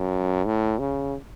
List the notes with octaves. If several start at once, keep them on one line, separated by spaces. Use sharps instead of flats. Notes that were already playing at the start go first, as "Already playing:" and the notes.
Already playing: F#2
A2
C#3